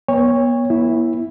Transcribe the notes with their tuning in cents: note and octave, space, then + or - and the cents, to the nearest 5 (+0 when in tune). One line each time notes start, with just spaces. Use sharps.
B3 -35 C#5 +0 G5 +45
B3 -45 E4 +0